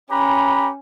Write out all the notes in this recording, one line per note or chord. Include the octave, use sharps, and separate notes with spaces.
C#4 G4 B4 A#5 B5